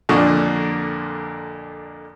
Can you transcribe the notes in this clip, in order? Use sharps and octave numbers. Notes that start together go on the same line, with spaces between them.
F2 A#2 D3 A#3 C#6